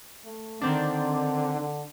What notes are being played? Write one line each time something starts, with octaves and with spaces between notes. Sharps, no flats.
A3
D3 D#3 C4 D4
D3